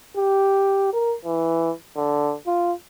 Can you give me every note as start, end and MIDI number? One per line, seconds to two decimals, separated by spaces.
0.17 0.91 67
0.93 1.15 70
1.25 1.71 52
1.96 2.34 50
2.47 2.72 65